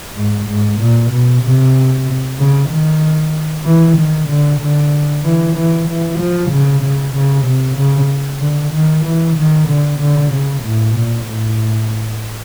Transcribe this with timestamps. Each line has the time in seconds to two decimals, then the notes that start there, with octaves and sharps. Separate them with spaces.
0.16 G#2
0.48 G#2
0.80 A#2
1.11 B2
1.43 C3
2.39 C#3
2.70 D#3
3.66 E3
3.97 D#3
4.29 D3
4.61 D3
5.24 E3
5.55 E3
5.88 E3
6.19 F3
6.51 C#3
6.82 C#3
7.14 C#3
7.46 C3
7.78 C#3
8.41 D3
8.73 D#3
9.05 E3
9.36 D#3
9.68 D3
10.00 D3
10.32 C#3
10.64 A2
10.96 A#2
11.26 A2